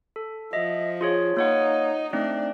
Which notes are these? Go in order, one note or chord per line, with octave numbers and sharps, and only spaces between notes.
A4
F3 D#5 E5
F4 G#4 C#5
A#3 D#4 C#5 F#5
A3 C4 D4 D#4